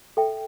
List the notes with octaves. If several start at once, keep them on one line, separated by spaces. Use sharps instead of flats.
A4 E5 G5